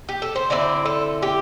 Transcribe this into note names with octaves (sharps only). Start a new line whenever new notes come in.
G4
A4
C5
D3 C4 E4 D5
A4
G4